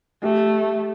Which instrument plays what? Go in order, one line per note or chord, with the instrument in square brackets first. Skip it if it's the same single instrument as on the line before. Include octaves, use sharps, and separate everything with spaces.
[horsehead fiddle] A3 [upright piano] G4